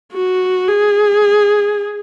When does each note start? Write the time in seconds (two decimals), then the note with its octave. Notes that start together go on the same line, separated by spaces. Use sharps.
0.13 F#4
0.68 G#4